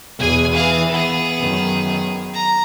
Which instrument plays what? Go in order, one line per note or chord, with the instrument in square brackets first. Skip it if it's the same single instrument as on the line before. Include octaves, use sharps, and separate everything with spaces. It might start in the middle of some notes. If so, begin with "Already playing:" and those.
[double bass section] E2 B2 [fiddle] G#4 G#5
[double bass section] E3 [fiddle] G#4 F5
[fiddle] B3 G#4
[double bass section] F#2 D#3
[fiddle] A#5